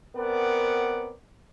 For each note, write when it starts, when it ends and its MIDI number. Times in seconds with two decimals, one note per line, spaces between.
0.16 1.13 59
0.16 1.13 60
0.16 1.13 70
0.16 1.13 74
0.16 1.13 78